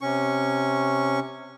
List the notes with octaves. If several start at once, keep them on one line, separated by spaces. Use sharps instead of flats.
C3 C#4 C#6